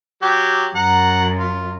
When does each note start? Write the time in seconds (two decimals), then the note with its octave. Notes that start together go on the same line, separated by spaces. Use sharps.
0.22 F#3 G4
0.75 F#2 F#5 A#5
1.38 F4